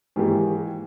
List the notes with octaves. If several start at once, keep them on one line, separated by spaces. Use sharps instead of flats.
G#2 D#3 E3 G#3 A#3 G4